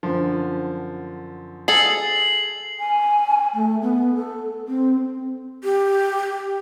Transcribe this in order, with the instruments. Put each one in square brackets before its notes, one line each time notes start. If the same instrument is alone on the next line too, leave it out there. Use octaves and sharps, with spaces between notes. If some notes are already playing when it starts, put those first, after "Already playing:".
[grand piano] F#2 D3 F3
[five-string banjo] G#4 A4 [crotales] C7 F#7
[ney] G#5
A3
B3
A4
C4
G4